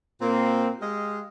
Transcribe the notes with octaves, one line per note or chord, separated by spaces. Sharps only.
A#2 A#3 C4
G#3 G4 D#5 F5